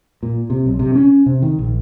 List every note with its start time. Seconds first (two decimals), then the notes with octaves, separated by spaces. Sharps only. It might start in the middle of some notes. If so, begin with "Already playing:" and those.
0.23 A#2
0.50 C3
0.66 B1
0.79 C3
0.95 C#4
1.26 C3
1.42 D#3
1.59 A#1